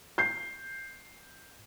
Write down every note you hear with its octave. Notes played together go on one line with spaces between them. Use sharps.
G6 C7